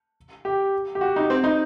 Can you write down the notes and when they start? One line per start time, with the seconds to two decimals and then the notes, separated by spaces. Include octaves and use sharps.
0.45 G4
0.95 G4
1.01 F#4
1.16 D#4
1.30 C4
1.44 D#4